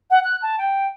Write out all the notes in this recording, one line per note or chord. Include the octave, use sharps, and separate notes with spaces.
F#5
F#6
A5
G5